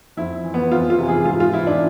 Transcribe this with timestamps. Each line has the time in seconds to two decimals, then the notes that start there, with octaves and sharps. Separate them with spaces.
0.17 F2 E4
0.44 E3
0.54 B3
0.71 F2 F4
0.90 F4
0.98 C3 E3
1.08 G#4
1.25 G#2 F4
1.40 F4
1.53 E3 E4
1.67 D4